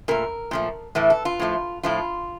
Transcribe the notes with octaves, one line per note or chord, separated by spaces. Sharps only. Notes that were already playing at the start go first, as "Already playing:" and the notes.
A#2 A3 A#4
A#2 F3 A3
A2 E3 A3
A4
F4
A2 F3 A3
A2 F3 A3 F4